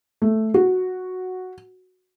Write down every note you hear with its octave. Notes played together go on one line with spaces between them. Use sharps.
A3
F#4